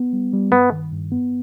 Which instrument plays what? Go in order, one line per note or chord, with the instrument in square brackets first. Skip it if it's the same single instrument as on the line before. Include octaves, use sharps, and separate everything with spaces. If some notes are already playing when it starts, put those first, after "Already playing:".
Already playing: [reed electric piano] B3
G3
G3
[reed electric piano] G2 [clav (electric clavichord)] B3
[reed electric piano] D#3
G2
B3